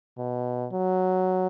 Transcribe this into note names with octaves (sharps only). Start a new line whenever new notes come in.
B2
F#3